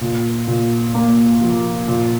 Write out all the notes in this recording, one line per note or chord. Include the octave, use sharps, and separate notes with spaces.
A#2
A#2
A#3
F3
A#2